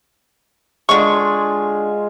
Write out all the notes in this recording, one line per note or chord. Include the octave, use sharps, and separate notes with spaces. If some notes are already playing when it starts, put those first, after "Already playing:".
D3 G#3 F4 C#6